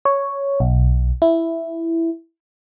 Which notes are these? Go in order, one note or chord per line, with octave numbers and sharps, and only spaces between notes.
C#5
B1
E4